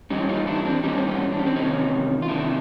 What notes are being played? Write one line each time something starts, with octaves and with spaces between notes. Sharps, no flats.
G#2 E3 G3 C#4 D#4
D#4 F4
D4 E4
C4 D4
G#2 E3 G3 C#4 D#4
C4
B3 C#4
D4
C#4
C4 D4
E2 C3 D#3 C#4 D#4
F4
E2 C3 D#3 D4 E4